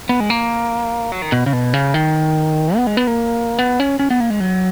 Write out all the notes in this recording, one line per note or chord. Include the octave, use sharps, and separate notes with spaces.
B3
G#3
A#3
F#3
D#3
B2
C#3
B2
C#3
D#3
B3
G#3
B3
A#3
B3
C#4
C#4
B3
A#3
G#3
F#3